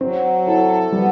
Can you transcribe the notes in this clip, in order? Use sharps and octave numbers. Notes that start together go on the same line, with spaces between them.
F#3 C4
E4 A4
G3 B3